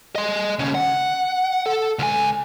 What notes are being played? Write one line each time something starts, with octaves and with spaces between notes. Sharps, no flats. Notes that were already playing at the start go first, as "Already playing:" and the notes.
D#5 C6
D#2 C#3
F#5
A4
C#2 G#5